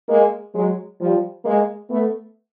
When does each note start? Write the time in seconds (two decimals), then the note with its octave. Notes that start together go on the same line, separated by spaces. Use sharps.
0.09 G#3 A#3
0.54 F#3 G#3
1.00 F3 G3
1.45 G#3 A#3
1.89 A3 B3